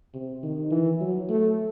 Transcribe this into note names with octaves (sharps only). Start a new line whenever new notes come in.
C3
D#3
E3
F#3
A3